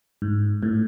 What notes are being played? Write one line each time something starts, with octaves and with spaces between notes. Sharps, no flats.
G#2
A2